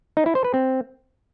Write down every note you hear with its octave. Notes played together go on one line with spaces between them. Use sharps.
D#4
E4
C5
B4
C4